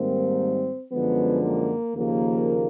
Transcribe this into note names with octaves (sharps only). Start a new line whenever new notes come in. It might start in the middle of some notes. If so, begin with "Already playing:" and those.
Already playing: G#2 D#3 G3 A#3 C4
F#2 D3 F3 G#3 B3
A#3
D#2 C#3 F3 A#3